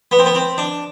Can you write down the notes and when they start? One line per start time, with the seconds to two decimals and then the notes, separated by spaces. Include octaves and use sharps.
0.11 B3
0.19 C4
0.26 B3
0.35 C4
0.58 D4